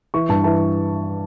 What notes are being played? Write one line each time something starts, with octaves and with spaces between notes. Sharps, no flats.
E3 C#6
G2 A5
E3 A5